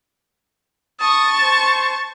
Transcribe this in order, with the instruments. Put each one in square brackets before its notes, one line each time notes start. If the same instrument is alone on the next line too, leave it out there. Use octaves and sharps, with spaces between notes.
[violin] A5 C#6 [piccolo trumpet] D#6
[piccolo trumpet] C5